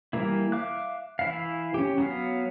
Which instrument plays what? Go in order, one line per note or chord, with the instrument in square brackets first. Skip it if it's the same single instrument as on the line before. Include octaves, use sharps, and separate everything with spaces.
[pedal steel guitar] E3 G3 A#3 E4
E5 F5 D6 F#6
E3 E4 F5
C#4 G4
F#3 B3 F5